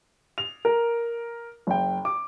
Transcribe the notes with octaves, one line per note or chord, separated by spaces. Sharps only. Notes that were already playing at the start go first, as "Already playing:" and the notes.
F7
A#4
F#1 G5
D6